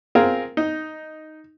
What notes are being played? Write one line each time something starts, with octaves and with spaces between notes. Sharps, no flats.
C4 F4 G#4 A#4
D#4